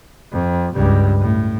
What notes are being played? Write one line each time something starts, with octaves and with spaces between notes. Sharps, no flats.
F2
C#2 G2
A2